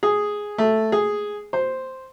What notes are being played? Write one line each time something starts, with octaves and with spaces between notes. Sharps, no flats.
G#4
A3
G#4
C5